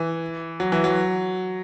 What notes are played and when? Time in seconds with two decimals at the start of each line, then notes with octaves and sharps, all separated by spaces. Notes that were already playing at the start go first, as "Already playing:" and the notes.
Already playing: E3
0.60 F#3
0.72 E3
0.84 F#3